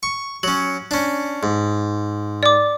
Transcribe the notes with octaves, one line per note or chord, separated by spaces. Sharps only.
C#6
F#3 C#4 F#7
C#4 D4
G#2
D5 D6